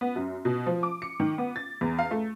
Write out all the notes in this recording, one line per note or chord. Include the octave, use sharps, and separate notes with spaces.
B3
F#2
B2
F3
D6
C#7
D#3
B3
A6
E2
F5
A3